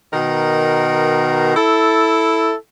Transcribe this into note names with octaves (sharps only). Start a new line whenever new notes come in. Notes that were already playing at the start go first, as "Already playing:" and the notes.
B2 D#3 A#4
E4 A4